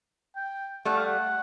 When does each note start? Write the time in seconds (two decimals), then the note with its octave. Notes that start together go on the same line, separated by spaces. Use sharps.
0.36 G5
0.85 G3 A3 F#5
0.96 F5
1.06 F#5